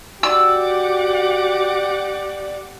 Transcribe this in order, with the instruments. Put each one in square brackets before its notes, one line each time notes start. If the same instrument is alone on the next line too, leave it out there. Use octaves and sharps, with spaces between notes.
[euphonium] F#4 [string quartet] G4 F#5 D6 [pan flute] D5 [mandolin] E6